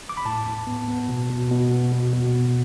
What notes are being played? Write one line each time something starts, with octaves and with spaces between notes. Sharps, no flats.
D6
B5
A2 A5
A2
B3
B3
B2
B2
B2
B3
B2
B2
B2